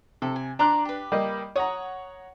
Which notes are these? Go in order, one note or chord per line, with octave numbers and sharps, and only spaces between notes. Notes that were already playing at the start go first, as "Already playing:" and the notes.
C3 A4
G#5
D4 A#5 C6 D6 F#6
G4 B4
G3 A#3 D#5
C#5 F#5 A#5 D#6